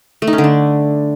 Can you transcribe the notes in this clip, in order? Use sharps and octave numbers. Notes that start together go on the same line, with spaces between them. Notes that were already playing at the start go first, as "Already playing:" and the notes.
A3
D#4
C#4
D3
D4